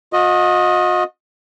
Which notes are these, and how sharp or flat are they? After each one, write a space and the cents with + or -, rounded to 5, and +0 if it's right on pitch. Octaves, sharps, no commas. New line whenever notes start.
F#4 -45 D#5 +5